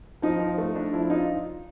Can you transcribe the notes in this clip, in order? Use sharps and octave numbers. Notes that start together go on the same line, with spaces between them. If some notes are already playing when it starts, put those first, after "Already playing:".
F3 D#4
F3
A3
D4
F3 E4
D4 D#4 F4